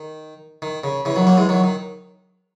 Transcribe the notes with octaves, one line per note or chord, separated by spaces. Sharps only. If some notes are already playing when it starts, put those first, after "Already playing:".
Already playing: D#3
D#3
C#3
C#3 E3
D#3 F#3
F#3 A#3
E3 G#3
D#3 F#3
D#3